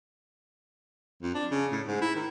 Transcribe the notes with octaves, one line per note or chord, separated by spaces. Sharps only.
F2
D4
C#3
A2
G#2
E4
D#3